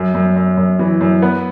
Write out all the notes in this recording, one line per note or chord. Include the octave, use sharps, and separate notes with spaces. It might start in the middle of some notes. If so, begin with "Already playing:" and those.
Already playing: F#2
F#2
F#2
F#2
E3
F#2
B3